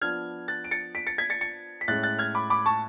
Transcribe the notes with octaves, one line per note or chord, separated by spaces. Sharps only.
F3 B3 D4 F6 G#6
F#6 A6
D7
A6 C#7
B6 D7
A6 C#7
G#6 B6
A6 C#7
A6 C#7
B6
A2 G#3 C#4 F#6 A6
F#6 A6
F6 G#6
B5 D6
B5 D6
A5 C#6